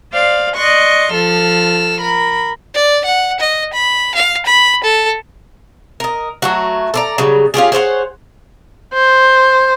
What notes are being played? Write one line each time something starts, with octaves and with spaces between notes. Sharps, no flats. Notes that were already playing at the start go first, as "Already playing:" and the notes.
C5 D5 F5
D5 D#5 C6 C#6 F#6
F3 A4 E6 F6
A#4 B5
D5
F#5
D#5
B5
F5
B5
A4
A#4 D#5
F#3 A3 F#4
A4 D5 A#5
C#3 F#3 G3
C#4 F4 G4 G#4
G#4 C5 C#5 F#5
C5